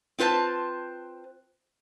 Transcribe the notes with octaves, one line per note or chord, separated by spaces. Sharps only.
C4 F4 B4 C5 A5